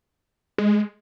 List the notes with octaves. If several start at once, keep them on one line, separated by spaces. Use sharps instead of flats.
G#3